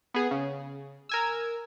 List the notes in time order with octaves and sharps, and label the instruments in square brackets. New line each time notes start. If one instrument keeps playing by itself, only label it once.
[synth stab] B3 G#4
C#3
A#4 G#5 E6